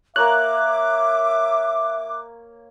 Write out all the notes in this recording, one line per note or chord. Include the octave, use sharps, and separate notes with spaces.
A#3 A#4 C#5 E5 D6 F#6